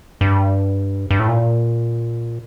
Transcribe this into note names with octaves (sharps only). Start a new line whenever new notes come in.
G2
G2
A2
A#2